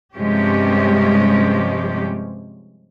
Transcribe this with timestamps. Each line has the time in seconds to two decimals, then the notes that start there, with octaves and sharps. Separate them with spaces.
0.14 G2 C3 F3 G#3 C#4 G4